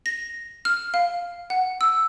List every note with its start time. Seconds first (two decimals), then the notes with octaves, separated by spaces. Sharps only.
0.06 A#6
0.65 F6
0.94 F5
1.50 F#5
1.81 E6